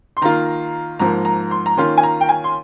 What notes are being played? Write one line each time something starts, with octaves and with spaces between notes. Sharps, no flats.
C6
D#3 A#3 F4 A#5
G#2 F3 A#3 A#5
A#5
C6
A#5
D#3 A#3 C#4 F4 C6
G#5
A#5
G5
G#5
C6